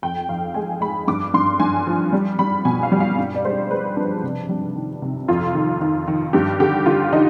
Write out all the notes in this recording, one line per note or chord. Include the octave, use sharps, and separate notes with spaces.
F2 G5
F2 F5
G#3 G#5
G#3 B5
G2 D6
G2 C6
G2 G#5
F3
G3
G3 B5
B2 G#5
F5
G3
F5
G2
D5
G#3 C5
G#3 B4
F3 D4
C3
G3
D#3
C3
F2 F4
D#3
D#3
D#3
G2 G4
D3 G4
D3 F4
D3 D#4